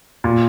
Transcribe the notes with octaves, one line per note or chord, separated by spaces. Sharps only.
A#2